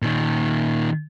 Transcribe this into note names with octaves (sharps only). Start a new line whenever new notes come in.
A#2 D#3